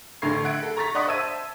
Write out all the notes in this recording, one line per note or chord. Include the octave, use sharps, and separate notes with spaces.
A1 D3 A4 C#6 G#6 C7
E5 F#5 G#6 D7
A4
A#5 C#6 A6 B6
D5 D#5 F#5 C6 C#6 D#6
C5 E5 A5 E6 G#6 D#7